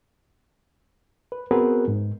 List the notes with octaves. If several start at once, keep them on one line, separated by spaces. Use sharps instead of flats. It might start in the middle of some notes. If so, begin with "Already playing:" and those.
B4
B3 C4 F#4 G#4 A#4 B4
G#2